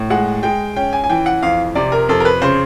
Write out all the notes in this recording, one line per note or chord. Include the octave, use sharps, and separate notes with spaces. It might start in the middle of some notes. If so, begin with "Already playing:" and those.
Already playing: A2
G#3 F#5
G#3 G5
C#4 G5
G#5
G#5
E3 G5
F#5
F2 F5
C3 D5
A#4
F2 A4
A#4
B4
C#3 C5